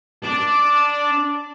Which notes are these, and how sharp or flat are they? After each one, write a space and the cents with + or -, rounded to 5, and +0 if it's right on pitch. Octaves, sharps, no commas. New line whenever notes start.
D4 -10 D5 +0